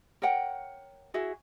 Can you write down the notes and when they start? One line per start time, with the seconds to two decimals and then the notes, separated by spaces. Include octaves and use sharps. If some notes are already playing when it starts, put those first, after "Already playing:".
0.22 A#4 C#5 F#5 G5
1.14 E4 F#4 G#4 E5